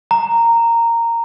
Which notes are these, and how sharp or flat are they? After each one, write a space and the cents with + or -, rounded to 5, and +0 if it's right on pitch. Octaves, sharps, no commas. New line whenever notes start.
A#5 -10